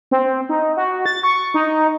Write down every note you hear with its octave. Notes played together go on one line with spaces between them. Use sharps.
C4
D#4
F#4
A6
C#6
D#4